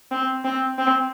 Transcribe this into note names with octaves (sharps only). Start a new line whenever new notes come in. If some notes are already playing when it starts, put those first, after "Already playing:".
C4
C4
C4